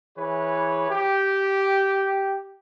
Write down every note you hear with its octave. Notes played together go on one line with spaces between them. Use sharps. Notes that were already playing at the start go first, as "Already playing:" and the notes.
E3 G#4 B4 C#5
G4